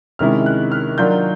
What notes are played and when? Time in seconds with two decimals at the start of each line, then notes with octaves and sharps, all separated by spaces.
0.19 C3 D#3 G#3 C#4 E4 F6
0.46 F#6
0.72 F6
0.98 D#3 F#3 A#3 D4 F4 G6